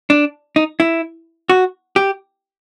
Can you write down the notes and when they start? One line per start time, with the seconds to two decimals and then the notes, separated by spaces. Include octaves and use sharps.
0.10 D4
0.56 D#4
0.80 E4
1.50 F#4
1.96 G4